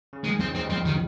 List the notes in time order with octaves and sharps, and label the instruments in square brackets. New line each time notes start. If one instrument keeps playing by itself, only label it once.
[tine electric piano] C#3
[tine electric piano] D#2 D#3 [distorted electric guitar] G#3
[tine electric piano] C#2 C#3 [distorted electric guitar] C4
[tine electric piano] D#2 D#3 [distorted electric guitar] C4
[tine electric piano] G3
[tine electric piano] F2 F3 [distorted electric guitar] C4
[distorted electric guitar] D#3